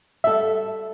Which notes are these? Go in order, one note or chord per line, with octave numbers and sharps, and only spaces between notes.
G3 F#4 A4 E5